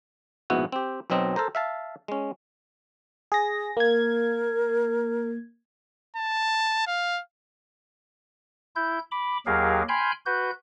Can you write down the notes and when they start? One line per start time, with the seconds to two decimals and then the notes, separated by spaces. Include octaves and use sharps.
0.50 A#1 G#2 B2 B3 E4 F#4
0.72 C4 G4
1.10 B1 B2 F#3 C4 D#5
1.36 A4 A#4 C5 A#5
1.55 E5 F5 A5
2.08 G#3 C#4
3.32 G#4 A#6
3.77 A#3 A#4 G#6
6.16 A5
6.87 F5
8.76 E4 G6
9.11 B5 D6
9.46 D#2 F#3 G4 G#4 A#4 F5
9.89 G5 G#5 B5 C6 F6 G6
10.26 F#4 B4 G6